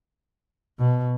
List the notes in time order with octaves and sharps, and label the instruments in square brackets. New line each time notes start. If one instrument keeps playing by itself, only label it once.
[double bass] B2